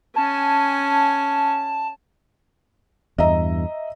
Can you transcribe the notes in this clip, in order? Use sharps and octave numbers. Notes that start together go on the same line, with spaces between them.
C#4 G#5 A5
E2 G2 D#5 E5 A#5